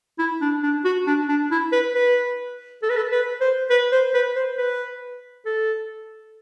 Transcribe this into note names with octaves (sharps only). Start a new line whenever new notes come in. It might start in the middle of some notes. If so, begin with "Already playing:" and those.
E4
D4
D4
F#4
D4
D4
E4
B4
B4
A4
B4
A4
B4
C5
B4
C5
B4
C5
B4
A4